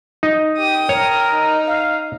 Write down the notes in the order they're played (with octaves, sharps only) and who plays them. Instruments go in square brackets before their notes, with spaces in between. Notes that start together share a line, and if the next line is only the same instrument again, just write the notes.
[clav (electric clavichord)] D#4
[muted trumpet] G4 [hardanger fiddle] G5 D#6
[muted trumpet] A#4 [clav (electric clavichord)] C#5
[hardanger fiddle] D#4
[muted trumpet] F5